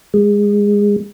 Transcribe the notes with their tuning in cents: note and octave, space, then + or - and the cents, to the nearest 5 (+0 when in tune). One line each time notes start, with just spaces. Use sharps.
G#3 -20